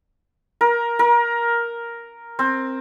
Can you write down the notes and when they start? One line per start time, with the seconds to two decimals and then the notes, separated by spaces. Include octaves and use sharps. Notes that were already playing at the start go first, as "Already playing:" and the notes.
0.61 A#4
0.99 A#4
2.39 C4